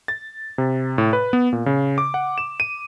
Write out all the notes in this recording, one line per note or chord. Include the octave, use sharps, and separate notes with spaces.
A6
C3
A2
B4
B3
A#2
C#3
D6
F#5
E7
D#7